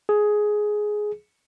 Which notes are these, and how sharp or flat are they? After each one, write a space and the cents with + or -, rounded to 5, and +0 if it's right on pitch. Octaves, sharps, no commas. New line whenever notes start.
G#4 +10